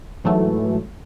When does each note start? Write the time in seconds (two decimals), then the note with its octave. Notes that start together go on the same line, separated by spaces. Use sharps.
0.24 G#2 E3 F#3 A3